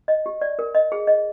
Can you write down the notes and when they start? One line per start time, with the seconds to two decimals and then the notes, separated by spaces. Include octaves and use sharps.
0.08 D#5
0.26 G4
0.42 D5
0.59 A#4
0.75 D#5
0.92 G#4
1.07 D#5